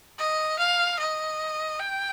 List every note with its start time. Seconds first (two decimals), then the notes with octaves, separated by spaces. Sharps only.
0.18 D#5
0.59 F5
0.99 D#5
1.79 G5